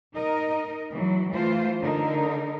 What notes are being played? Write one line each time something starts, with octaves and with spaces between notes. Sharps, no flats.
D#4 A#4 D#5
E3 F#3
E3 A3 F4 C5
D3 D#4 A#4